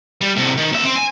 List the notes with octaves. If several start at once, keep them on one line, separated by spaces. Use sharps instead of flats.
G3
A2 C3
D#3
D#2 E5
C4
G#5